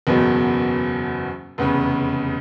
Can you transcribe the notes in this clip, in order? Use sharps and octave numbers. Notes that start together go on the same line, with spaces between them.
F#1 E2 B2 F#3 B3
F1 E2 C#3